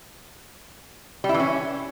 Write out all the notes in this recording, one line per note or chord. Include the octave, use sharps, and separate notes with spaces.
G3
E4
E3
C#4